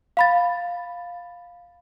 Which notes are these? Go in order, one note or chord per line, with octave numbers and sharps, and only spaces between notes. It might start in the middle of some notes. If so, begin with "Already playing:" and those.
F5 B5 A6